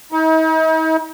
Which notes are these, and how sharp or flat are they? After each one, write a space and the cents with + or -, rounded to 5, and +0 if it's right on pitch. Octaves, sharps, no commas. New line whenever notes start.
D#4 +45